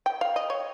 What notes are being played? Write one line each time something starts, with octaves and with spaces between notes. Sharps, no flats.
G5
F5
D#5
C#5